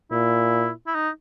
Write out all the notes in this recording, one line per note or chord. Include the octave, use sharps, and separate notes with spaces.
A#2 E4
E4
D#4